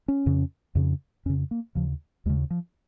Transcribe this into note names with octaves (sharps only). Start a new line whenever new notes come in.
C#4
F2 C#3
F2 C#3
F2 C#3 C#4
A#3
D#2 C#3 F3
D#2 C#3 G#3
F3